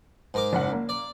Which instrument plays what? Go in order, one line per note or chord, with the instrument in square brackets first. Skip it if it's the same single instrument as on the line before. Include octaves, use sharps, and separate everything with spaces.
[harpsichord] G#2 A#4 D6
[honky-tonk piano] F#1 F#5
A#3
[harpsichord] D5